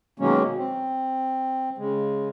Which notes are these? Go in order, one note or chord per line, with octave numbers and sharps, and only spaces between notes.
B2 D#3 F#3 G#3 A#3 C#4
C4
C#3 G#3